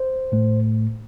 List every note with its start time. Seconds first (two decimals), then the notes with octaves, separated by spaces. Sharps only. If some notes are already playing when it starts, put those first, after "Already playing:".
Already playing: C5
0.32 A2 A3